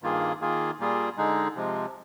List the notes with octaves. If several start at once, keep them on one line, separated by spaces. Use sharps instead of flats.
G2 D#3 A#3 F4 G#4
D#3 A#3 F4 G#4
A#2 G3 A#3 F4 G#4
D3 G#3 D#4 G#4
C3 F3 G#3